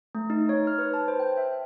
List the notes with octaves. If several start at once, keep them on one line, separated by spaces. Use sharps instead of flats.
A3
D#4
C#5
F6
B4
A5
C5
G5
E5